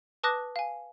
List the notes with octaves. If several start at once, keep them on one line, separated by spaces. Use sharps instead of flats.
B4 A5 D6 D#6 F#6 A#6
F5 G#5